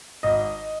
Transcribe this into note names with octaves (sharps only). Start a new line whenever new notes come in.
G#1 D#5